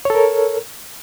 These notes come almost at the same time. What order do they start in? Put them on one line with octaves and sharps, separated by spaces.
C#5 A4 A#4